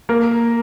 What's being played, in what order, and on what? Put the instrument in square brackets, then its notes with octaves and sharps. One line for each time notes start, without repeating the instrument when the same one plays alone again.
[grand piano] A#3 A#4